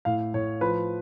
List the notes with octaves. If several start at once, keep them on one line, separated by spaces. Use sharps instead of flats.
A2 F5
A2 C#5
F3 B4